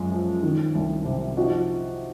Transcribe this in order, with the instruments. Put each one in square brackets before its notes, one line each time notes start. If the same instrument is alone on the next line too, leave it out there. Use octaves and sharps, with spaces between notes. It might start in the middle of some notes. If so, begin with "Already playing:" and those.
Already playing: [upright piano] F#2 G#3 F4
F3
D#3
C2
C3
F3 D#4 F#4